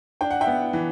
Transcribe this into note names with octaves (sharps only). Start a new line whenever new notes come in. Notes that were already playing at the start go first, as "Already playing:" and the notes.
D4 G5
F#5
E5 G5
B3
E3